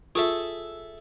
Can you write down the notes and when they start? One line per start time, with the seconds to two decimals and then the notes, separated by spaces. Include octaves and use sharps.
0.15 F4 G#4 A4 E5